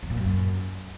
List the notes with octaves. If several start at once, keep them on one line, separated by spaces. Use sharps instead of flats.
E2
A#2
F#2